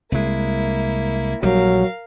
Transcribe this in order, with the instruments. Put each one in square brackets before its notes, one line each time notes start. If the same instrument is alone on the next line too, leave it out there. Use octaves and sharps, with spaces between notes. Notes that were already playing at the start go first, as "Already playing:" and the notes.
[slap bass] C2 G#3 [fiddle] A#3 E4
[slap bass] A#1 G3 [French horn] F#3 [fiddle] A#4 F5